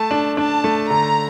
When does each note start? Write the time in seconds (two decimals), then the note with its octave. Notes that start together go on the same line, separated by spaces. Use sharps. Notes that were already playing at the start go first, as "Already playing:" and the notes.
Already playing: A3 A5
0.11 D4
0.37 D4 A5
0.64 A3
0.90 D3 A#5